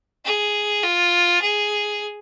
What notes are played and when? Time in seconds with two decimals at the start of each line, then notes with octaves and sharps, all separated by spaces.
0.26 G#4
0.84 F4
1.42 G#4